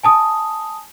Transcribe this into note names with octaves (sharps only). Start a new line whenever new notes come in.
G#5 A5 D#6